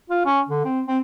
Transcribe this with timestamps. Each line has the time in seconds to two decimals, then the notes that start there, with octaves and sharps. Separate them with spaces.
0.10 F4
0.25 C#4
0.49 D3
0.65 C4
0.87 C4